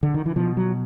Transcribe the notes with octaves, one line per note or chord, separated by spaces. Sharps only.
D3
D#3
E3
B2 F3
F#3